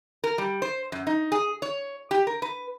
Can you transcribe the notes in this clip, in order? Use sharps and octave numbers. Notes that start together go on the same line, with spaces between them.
A#4
G3
C5
F#2
D#4
G#4
C#5
G4
A#4
B4